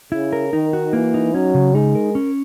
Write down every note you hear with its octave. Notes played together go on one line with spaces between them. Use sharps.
C#3 E4
A#4
D#3 D#4
F#4
E3 A#3
D#4
F#3 C#4
C#3
G#3 D#4
A#4
C#4